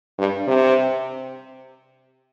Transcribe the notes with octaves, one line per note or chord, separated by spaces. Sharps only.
G2
C3